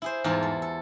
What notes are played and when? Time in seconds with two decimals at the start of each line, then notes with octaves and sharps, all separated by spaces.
0.02 E4 G#4 C5
0.24 E2 G#2 G3 E4 F4 A5
0.43 A4
0.62 A4